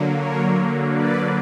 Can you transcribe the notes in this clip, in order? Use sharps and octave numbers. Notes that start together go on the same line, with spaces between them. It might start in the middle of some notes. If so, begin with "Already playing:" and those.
Already playing: D3 F#3 A#3
A#4 C#5
B4 D5